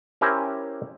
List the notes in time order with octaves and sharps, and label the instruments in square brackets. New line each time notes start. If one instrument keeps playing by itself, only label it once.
[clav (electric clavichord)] C#4 E4 G4 A#4 C5 G#5